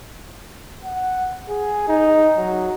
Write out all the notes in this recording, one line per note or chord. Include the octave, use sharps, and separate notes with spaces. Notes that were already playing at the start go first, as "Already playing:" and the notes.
F#5
G#4
D#4
F#3